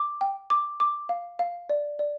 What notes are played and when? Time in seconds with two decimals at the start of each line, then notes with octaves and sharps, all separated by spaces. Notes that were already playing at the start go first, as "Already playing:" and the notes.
Already playing: D6
0.21 G5
0.50 D6
0.80 D6
1.09 F5
1.39 F5
1.70 D5
1.99 D5